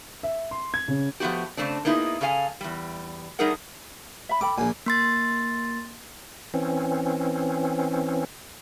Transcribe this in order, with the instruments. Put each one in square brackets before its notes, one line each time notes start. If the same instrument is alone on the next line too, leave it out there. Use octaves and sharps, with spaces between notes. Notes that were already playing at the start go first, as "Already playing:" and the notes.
[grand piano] E5
C6
G#6
C#3
[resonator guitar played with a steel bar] F3 A3 B3 F#4 G4
C#3 A3 C4 D4
A#3 B3 D#4 E4 G#4
C#3 G#4 A4 F5 G#5
E2 G3
G3 A3 D#4 G#4 A#4 F#5
[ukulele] E5 B5
[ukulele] A4 G5 B5 [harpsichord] D6
[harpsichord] A#1 A#2 [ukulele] G#5
[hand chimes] A#3 C6 A6
[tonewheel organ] E3 C4 C#4